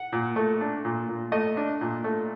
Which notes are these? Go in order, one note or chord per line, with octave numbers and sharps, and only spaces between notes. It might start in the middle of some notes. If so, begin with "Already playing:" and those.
Already playing: F#5
A#2
A3
D4
A#2
A#2
A3 D#5
D4
A#2
A3